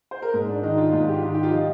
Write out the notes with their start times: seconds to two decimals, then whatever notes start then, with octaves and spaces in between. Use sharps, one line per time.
0.11 C5
0.22 A#4
0.33 G#2 G#4
0.49 D4
0.63 D#3 D#4
0.77 F4
0.92 G#2 F4
1.09 G4
1.13 F4
1.23 D#3
1.34 G4
1.43 F4
1.52 F3 D#4